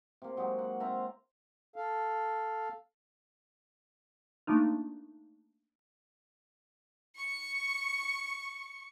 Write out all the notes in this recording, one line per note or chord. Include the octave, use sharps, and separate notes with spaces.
C3 A#3
F#3 G#3 D#4 G4
F#5
C4 F4 E5 A#5
A4 F5
A3 A#3 D4 D#4 F4
C#6 C#7